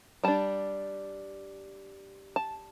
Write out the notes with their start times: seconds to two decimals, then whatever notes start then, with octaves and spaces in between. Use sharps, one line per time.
0.24 G3 D4 A5
2.36 A5